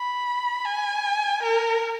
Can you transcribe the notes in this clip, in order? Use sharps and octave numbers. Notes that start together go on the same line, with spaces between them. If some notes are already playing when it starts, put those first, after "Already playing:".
Already playing: B5
G#5
A#4